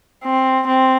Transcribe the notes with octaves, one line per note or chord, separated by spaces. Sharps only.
C4
C4